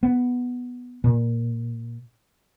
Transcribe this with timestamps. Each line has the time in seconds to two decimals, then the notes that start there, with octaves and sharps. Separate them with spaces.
0.03 B3
1.04 A#2